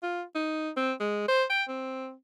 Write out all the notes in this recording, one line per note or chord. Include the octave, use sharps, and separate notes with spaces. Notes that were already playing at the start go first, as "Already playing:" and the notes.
F4
D#4
C4
G#3
C5
G5
C4